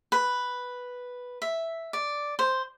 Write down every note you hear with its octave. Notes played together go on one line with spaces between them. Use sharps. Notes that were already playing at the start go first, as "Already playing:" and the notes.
B4
E5
D5
C5